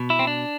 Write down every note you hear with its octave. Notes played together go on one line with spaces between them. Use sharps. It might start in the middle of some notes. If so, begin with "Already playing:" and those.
Already playing: B2
E4
C4
D4